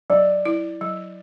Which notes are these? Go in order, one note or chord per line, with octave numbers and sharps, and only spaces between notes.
F#3 D5
E4
F#3